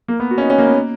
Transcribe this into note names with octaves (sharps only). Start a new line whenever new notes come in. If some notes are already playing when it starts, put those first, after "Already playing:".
A#3
B3
F#4
C#4
D#4
C#4
A#3
B3
A#3